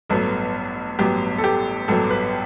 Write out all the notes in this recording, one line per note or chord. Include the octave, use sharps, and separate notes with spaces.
A1 G2 F#3 B3 A4
A1 G2 F#3 B3 G4
A4
G4
A1 G2 F#3 B3 A4
B4